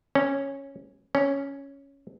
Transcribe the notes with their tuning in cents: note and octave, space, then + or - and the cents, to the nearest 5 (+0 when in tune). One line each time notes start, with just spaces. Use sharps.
C#4 -5
C#4 +5